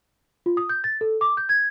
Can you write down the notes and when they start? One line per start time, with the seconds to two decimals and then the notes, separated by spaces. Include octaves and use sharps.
0.46 F4
0.57 D#6
0.69 G6
0.84 A6
1.01 A4
1.21 D6
1.37 G6
1.49 G#6